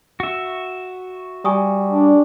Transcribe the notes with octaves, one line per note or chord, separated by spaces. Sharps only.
F#4 E5
G3 G#5 C#6 D#6
D4